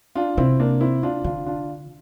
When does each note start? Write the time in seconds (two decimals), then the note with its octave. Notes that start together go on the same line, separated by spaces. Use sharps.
0.15 D4 F4
0.37 C3 C4 E4
0.60 A#3 D4
0.81 C4 E4
1.03 D4 F4
1.24 D3 D4 F4
1.46 D4 F4